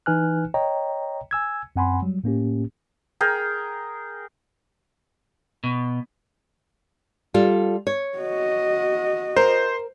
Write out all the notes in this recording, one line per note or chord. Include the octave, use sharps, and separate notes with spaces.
E3 D#4 B4 G#5 F6 F#6
C#5 D#5 G5 A#5
G#5 E6 G#6
F#2 C4 F#5 G#5 B5 C6
F#3 G3
A2 A#3 C#4 G4
G#4 A#4 G5
B2
G3 F4 A4
C#5
F#4 D#5
A#4 C5